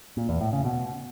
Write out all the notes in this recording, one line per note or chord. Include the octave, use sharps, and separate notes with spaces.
A#2
E2
A2
C#3
B2